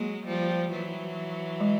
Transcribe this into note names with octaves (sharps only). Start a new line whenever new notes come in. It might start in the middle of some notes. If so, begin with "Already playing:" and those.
Already playing: F#3 G#3 A#3
F3 G3
E3 F#3
G#3